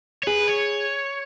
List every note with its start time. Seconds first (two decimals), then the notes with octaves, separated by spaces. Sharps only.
0.23 C#5
0.27 G#4 B4
0.48 C#5